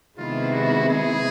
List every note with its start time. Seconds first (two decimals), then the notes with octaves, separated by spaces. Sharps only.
0.17 C3 D#3 G#3 B3 E4 F4
0.53 F#4
0.89 G#4